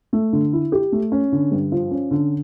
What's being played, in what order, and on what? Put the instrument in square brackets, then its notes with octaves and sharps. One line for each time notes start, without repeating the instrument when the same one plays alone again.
[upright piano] A3
D3
E4
G4
A3
C#4
D3
G2
F3
C#4
D3